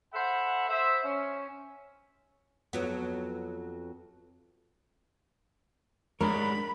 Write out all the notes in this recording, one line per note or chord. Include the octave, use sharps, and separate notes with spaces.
A4 C5 E5 F#5 B5
C5 E5
C#4
F2 F#3 B3
G#2 G#3 D4 A#4 C#5 B5